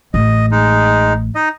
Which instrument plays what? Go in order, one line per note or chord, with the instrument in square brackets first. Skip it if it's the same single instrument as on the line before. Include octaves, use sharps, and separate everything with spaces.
[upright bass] A1 [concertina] D#5
[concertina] G#3 D#4
D#4 D#5